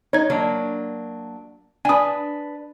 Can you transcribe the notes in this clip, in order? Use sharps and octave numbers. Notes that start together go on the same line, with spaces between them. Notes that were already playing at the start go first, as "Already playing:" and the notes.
D#4 C#5 G#6
F#3 A#3 D4
D4 B4 G#5 D#6